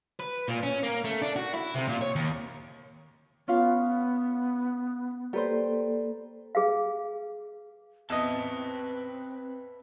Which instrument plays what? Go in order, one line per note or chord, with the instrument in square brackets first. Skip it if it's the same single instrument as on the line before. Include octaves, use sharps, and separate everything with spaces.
[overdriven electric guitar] B4
A#2
C#4
A#3
A3
D4
F#4
E4
C3
A#2
C#5
D#2
[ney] B3 [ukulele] C#4 F4 F5
[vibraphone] A#3 A4 D5 [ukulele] G4 B4 C5
[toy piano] G#4 B4 F5
[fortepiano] E2 D#5 [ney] C4 [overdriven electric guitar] B4 A5